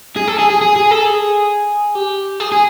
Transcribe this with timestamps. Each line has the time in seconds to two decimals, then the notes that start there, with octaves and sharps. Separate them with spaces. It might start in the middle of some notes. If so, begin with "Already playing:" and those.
0.16 G#4
0.27 A4
0.39 G#4
0.50 G#4
0.61 G#4
0.76 G#4
0.91 A4
1.05 G#4
1.95 G4
2.40 G#4
2.52 G#4